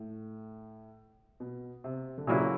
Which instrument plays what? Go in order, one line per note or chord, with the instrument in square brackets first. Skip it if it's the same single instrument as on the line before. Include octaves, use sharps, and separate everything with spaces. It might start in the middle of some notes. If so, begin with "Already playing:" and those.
Already playing: [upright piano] A2
B2
C3
D3
[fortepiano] A#2 F#3 A#3 C#4 E4 [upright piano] C#3